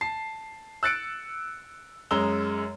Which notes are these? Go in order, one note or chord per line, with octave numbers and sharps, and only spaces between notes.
A5 C7
E6 F#6 A6 C#7 D7
F#2 G#3 A#5 E6 G7